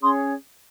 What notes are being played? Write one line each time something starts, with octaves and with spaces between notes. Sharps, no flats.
C#4 G#4 C#5 C6 D#6